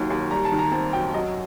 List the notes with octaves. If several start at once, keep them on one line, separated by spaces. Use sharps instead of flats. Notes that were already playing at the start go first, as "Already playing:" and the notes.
Already playing: D#2 D#3 F#3
D#2
G3 A#5
A5
D#3
A#5
C4 A5
F#2 G5
F#3 D#5